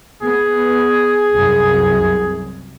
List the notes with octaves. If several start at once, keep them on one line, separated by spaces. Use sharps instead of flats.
B3 G#4
C2 F#2